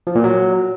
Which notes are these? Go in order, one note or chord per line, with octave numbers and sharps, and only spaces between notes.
F3
A#2
F#3